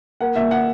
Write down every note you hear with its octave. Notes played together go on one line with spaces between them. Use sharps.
A#3 F#5
A#2 E5
F#5